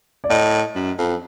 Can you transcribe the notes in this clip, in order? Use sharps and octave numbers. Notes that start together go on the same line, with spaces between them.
D5
A2 D#5
F#2
F2